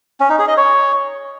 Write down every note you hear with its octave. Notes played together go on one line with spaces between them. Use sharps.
C#4
D#4
G#4
D#5
C#5